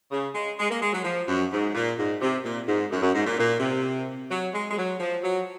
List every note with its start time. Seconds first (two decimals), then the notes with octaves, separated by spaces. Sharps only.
0.11 C#3
0.35 G#3
0.59 G#3
0.70 A#3
0.82 G#3
0.93 F#3
1.05 F3
1.27 F#2
1.52 G#2
1.75 A#2
1.98 G#2
2.21 C3
2.44 A#2
2.68 G#2
2.91 F#2
3.02 F#2
3.14 G#2
3.26 A#2
3.38 A#2
3.60 C3
4.31 F#3
4.54 G#3
4.71 G#3
4.77 F#3
5.00 F3
5.23 F#3